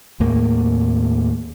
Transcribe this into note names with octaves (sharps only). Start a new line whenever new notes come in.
D#2 A2 A#3